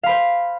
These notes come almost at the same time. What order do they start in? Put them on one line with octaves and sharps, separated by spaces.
F5 B5 C5